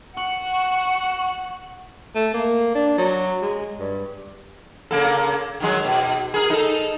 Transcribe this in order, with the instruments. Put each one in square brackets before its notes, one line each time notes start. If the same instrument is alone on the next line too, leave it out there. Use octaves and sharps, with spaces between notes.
[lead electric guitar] F#4 [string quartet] F#5
[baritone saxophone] A3
A#3
D4
F#3
G#3
G2
[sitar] C#3 A#3 A4
D#3 F#3 G#3
B2
G#4 A#4
D#4 A4